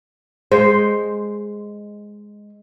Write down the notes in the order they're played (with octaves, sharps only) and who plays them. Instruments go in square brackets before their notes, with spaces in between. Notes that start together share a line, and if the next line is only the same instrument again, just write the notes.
[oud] G#3 [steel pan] C5